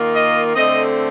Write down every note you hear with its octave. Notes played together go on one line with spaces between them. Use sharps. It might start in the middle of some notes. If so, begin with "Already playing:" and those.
Already playing: D#3 A#3 F4
D#5
D3 A3 C4 D#5